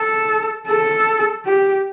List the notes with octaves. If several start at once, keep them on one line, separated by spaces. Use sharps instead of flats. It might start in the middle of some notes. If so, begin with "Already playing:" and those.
Already playing: A4
A4
G4